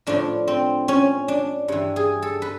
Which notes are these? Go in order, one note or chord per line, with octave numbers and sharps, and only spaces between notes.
A2 F3 D4
C4
C#4
D4
G2 E3
G#4
A4
B4